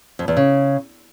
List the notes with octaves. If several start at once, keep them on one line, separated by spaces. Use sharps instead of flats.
F2
E2
C#3